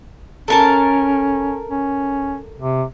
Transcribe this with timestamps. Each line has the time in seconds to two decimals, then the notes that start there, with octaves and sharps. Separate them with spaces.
0.48 C#4 A4 A#4 A5
1.71 C#4
2.59 C3